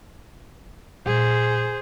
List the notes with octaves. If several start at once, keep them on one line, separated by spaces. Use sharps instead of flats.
A#2 G#3 G#4 C5